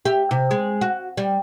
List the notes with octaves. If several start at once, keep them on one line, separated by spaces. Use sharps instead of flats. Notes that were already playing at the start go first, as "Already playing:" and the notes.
G4 E5
C3
G#3
F#4
G3